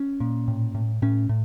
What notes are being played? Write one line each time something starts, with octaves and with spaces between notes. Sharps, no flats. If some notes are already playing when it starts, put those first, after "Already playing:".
Already playing: C#4
A#2
A2
A2
A2 C#4
A2